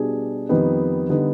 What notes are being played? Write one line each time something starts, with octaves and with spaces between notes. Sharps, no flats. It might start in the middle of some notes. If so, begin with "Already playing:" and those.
Already playing: B2 G3 D4 G#4
F2 D#3 G3 B3 D#4
D3 G3 B3 D#4